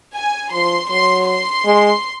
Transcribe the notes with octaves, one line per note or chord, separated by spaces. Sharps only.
G#5
F3 C6
F#3 C6
C6
G#3